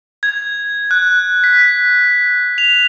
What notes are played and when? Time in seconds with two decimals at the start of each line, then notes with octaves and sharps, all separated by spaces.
0.23 G#6
0.91 F#6
1.44 B6
2.58 F7